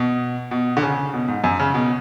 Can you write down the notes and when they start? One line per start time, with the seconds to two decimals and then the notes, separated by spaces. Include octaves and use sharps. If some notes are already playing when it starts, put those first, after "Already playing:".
Already playing: B2
0.51 B2
0.77 D3
0.82 C#3
1.13 B2
1.28 G#2
1.44 F#2
1.60 C#3
1.74 B2